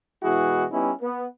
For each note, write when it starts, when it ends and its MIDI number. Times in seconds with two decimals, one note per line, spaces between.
0.23 0.65 47
0.23 0.65 52
0.23 0.65 56
0.23 0.65 64
0.23 0.65 66
0.23 0.65 68
0.72 0.90 55
0.72 0.90 59
0.72 0.90 61
0.72 0.90 63
0.72 0.90 64
1.02 1.26 59